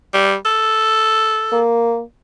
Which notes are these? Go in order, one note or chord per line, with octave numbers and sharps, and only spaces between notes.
G3
A4
A#3